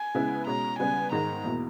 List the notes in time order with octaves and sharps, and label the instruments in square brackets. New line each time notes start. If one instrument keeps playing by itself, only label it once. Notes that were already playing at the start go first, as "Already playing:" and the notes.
Already playing: [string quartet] G#5
[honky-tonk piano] C#3 G#3 B3 E4
[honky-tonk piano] B2 G#3 C#4 [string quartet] A#5
[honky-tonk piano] C#3 G3 B3 [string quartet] G#5
[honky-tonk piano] G#2 D#3 G#3 D#4 [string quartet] A#5
[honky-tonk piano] E2 B2 A#3 E4